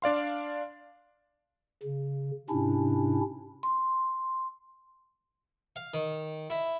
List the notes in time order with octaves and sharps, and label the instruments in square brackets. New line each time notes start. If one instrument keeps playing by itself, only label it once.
[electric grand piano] D4 D5 F5 C6
[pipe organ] C#3
G#2 C3 C#4 D4 E4
[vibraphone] C6
[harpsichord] F5
D#3
E4